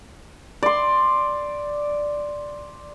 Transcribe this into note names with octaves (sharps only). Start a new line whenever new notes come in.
D5 C6